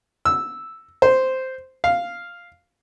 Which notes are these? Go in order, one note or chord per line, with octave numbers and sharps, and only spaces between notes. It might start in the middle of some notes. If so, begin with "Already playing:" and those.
E6
C5
F5